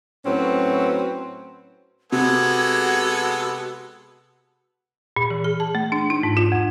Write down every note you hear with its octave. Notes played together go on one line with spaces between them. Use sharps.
A2 F#3 C4 C#4 B4
C3 G#3 B3 F#4 A4 G#6
A#2
E3
G#4
A5
A3
D4
D#4
G#2
F4
F2